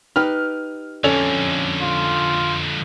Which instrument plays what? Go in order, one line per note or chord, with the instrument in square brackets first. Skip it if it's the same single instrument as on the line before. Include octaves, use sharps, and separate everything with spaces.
[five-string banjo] D#4 G4 B4 [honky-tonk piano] F6
[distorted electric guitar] F2 D3 [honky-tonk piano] C#4 A4 F7
[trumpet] F4